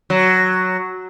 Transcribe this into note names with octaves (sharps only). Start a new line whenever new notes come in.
F#3